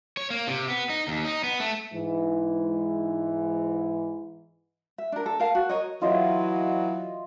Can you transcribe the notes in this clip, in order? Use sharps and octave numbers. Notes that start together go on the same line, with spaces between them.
C#5
A#3
C3
B3
D#4
D#2
D#4
B3
A3
G#2 E3
E5
D4 A#4
A4
A#4 F5 A5
F#4
A#4 C#5 D#5
E3 F#3 F4 D#5 E5